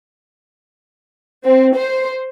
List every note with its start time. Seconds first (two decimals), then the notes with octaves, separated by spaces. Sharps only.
1.45 C4
1.75 C5